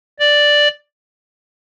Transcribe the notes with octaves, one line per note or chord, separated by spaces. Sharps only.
D5